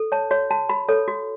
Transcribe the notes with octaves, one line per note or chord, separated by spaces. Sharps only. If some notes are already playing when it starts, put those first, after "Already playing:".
Already playing: A4
C#5 A5
F#4 C#5
F#4 A5
F#4 B5
A4 C#5
F#4